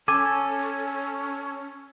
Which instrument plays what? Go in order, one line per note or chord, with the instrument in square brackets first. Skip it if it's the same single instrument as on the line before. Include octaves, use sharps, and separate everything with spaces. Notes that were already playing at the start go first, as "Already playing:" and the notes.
[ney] C#4 [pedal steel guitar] A4 [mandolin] G#5 [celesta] D6